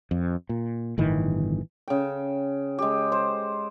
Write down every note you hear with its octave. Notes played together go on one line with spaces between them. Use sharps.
F2
A#2
G1 A2 D#3 E3
C#3 G5
G#3 G4
C5